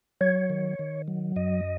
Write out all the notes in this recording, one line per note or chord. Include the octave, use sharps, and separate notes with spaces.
F#3 C#5
D#3
D#3
F#3
F#2 D#5